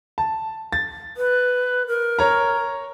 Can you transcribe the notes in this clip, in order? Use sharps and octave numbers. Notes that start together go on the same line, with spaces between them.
A5
A6
B4
A#4
C#5 A#5